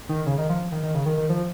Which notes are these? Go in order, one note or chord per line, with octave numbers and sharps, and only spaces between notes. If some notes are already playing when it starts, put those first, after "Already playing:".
D#3
C#3
D#3
F3
D#3
D#3
C#3
D#3
D#3
F3